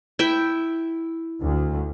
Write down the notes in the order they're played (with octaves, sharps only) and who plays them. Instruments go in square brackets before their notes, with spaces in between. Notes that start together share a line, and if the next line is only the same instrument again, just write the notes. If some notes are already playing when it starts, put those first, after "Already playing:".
[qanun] E4 E5 G5
[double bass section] D2